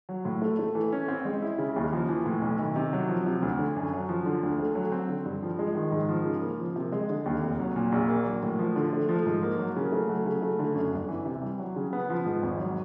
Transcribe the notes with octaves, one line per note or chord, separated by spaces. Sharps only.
F#3
A2
A3
A3
E3
C#4
C4
G#3
E4
C#3
D#2
F3
E3
A2
B1
D#3
C3
F#3
F3
C3
D2
D3
F#2
F#3
F3
D3
D2
A3
F#3
C4
D3
G2
F3
G#3
D#3
G#2
F3
C#3
A#3
F3
C3
G#3
D3
D#2
F1
F#3
A#2
A#1
A#3
F#3
A2
F3
D3
A3
F3
G#2
A#3
F#3
C#3
A3
F#3
C#3
A3
D3
F#2
G1
E3
C3
G3
F#3
C#3
B3
F3
G#2
G#1
F#3